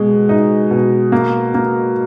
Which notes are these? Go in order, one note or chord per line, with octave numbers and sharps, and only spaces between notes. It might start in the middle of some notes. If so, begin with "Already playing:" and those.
Already playing: B2 G#3
D#4
B2
A#3
A#3